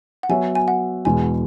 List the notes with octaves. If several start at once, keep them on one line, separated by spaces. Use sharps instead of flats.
F#5
F#3 B3 F#4 C#5 E5 G#5
G#5
F#5
E2 B2 G#3 G#5